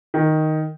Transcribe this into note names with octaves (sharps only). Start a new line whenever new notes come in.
D#3